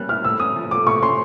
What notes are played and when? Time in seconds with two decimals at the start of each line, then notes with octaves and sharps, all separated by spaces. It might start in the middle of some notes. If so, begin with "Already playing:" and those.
Already playing: G3 A#3 C#4 F#6
0.09 E4 F6
0.24 A2 E6
0.40 C#4 D#6
0.56 F3
0.71 A3 D6
0.87 A2 C#6
1.02 C#4 C6